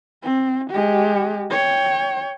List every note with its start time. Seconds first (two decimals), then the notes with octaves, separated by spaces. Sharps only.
0.23 C4
0.70 G#3 G4
1.50 C#5 G5